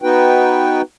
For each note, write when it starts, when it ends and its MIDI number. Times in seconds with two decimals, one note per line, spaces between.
0.02 0.82 59
0.02 0.82 63
0.02 0.82 66
0.02 0.82 71
0.02 0.82 79